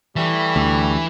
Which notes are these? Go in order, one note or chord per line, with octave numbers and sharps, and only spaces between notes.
E3 G3 A3
D2